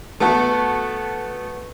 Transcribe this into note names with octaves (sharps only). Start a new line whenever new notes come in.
A3 B3 F#4 A4